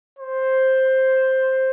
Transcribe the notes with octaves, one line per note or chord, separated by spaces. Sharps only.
C5